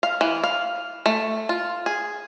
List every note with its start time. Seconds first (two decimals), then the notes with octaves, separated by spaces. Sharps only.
0.03 F5
0.21 E3
0.43 F5
1.06 A3
1.49 F4
1.86 G#4